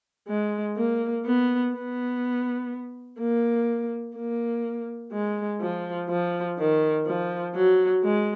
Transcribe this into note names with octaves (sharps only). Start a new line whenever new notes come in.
G#3
A#3
B3
B3
A#3
A#3
G#3
F3
F3
D#3
F3
F#3
G#3